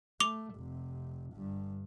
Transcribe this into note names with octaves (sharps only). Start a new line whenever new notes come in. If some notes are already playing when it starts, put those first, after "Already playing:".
A3 D6 F7 G7
F1 C3
G1 G2